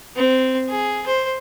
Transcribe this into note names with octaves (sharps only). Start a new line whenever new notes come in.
C4
G#4
C5